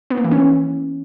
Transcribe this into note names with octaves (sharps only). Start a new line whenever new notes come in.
B3
A#3
E3
C#4
E3